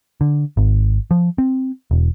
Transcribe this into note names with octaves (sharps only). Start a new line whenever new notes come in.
D3
G#1
F3
C4
E1